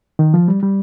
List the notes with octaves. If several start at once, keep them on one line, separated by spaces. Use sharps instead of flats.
D#3
F3
G3
G3